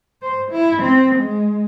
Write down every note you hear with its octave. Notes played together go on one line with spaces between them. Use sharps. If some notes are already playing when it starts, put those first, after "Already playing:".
C5
E4
C4
G#3